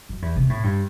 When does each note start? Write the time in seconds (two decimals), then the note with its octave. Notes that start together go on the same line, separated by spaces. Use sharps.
0.09 F#2
0.22 E2
0.36 C3
0.50 A2
0.63 G2